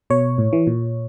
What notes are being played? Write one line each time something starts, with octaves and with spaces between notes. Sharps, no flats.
B2 C#5
A2
E3
A#2